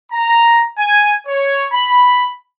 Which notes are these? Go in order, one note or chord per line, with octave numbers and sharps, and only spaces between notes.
A#5
G#5
C#5
B5